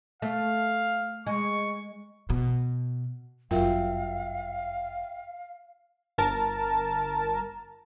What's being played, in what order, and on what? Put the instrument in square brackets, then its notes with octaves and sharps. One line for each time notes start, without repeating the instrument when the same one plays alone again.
[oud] A3 [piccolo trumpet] F5
[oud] G#3 [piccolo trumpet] C#6
[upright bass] B2
[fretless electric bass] G1 F#2 [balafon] F4 A#4 [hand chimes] E5 G5 [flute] F5
[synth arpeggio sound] G1 A#4 A5